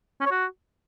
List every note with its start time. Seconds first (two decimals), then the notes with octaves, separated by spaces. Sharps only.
0.21 C#4
0.26 C#5
0.31 F#4